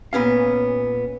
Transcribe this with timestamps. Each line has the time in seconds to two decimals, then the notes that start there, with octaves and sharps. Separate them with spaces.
0.13 A#2 B3 C#4 F5